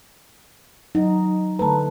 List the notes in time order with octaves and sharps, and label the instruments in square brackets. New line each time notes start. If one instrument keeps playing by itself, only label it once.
[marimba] F#3 [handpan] D#4
[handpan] D3 A3 B4 [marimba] A5 A#5